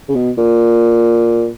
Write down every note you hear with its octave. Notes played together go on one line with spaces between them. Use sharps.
C#3
B2
A#2